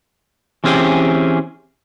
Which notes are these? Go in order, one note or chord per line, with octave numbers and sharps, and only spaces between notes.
E3 C4 C#4 G4 G#4